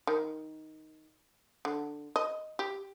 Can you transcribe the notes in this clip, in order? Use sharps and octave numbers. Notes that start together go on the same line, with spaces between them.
D#3
D3
D#5
G4